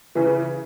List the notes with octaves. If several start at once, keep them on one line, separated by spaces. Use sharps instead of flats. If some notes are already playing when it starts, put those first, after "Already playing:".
C#3 E3